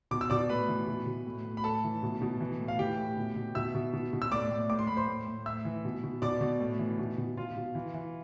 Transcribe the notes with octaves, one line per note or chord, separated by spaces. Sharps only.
B2 D6
E6
B2 D5 D6
A2 B4 B5
E3
B2
B2
A2
A2
B5
A2 A4 A5
E3
B2
B2
E3
A2
F5
E3 G4 G5
A2
B2
B2
B2 E5 E6
B2
B2
B2
E6
A2 D5 D6
A2
A2 D6
C6
A2 B5
C5 C6
A2
A2
A2 E5 E6
E3
B2
B2
B2 D5 D6
B2
A2
E3
B2
B2
B2 F4 F5
B2
E3
E3